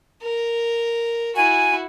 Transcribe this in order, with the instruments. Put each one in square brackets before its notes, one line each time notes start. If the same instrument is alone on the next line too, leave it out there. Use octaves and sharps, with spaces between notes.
[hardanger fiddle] A#4
[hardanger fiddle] E4 F#4 [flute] G#5